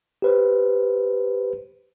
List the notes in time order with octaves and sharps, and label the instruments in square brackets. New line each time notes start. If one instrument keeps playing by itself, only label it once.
[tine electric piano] G4 B4 C5